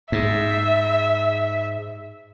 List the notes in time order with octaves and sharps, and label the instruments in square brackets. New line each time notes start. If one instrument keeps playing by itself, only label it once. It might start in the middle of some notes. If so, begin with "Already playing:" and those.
[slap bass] G#2 [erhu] E5